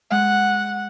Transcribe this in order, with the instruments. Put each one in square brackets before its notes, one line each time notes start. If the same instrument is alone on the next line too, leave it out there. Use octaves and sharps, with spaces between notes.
[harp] G#3 [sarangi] F#5